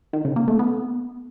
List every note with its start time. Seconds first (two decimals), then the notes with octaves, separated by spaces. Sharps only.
0.13 D#3
0.25 C#3
0.36 A#3
0.48 A3
0.59 B3